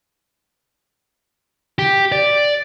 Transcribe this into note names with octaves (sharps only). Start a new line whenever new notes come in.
G4
D5